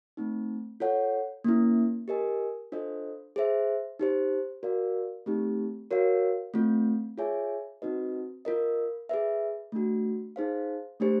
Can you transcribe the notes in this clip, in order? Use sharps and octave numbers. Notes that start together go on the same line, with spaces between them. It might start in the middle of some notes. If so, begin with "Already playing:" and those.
A3 C4 D#4
F4 A4 C#5 F#5
A#3 C#4 E4
G4 A#4 D#5 G#5
D4 F4 A4 C5 D#5
G#4 C5 E5
D#4 G4 C5
F#4 A#4 D5 F5
A3 C4 D#4 G4
F#4 A#4 C#5 F5
A3 C4 F4
F4 G#4 C#5 E5 G#5
C4 D#4 F#4 B4 D#5
F4 A#4 D#5
G#4 B4 E5
A3 D4 F#4
D#4 G#4 C5 F5
A3 D4 G4 C5